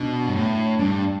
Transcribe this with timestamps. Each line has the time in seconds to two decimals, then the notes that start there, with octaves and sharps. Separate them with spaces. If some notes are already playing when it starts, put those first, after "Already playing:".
Already playing: B2 D4
0.27 G2
0.35 A2
0.79 G2 D4